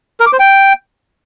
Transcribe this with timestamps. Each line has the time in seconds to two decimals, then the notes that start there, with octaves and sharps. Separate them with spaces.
0.20 A#4
0.26 D6
0.33 C5
0.39 G5